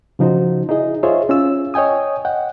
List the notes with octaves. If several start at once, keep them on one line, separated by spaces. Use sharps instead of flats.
C#3 F3 D#4 F#4 C5
D#4 E4 G#4 D#5
F4 G#4 C5 C#5 D#5 E5
C#4 F4 E6
C#5 D#5 G5 G#5 D#6
D#5 F#5 G5